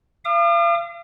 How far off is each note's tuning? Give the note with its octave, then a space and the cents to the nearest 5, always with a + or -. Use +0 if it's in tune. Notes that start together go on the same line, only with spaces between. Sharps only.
F5 -40 D6 +45